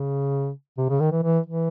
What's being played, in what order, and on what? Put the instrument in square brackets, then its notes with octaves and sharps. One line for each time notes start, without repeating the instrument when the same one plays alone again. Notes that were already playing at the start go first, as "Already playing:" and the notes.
Already playing: [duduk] C#3
C3
C#3
D#3
E3
E3
E3